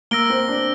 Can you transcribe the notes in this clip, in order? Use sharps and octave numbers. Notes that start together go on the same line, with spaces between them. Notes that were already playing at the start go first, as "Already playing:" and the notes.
A#3 E6 A#6 D7 G7
C4
D4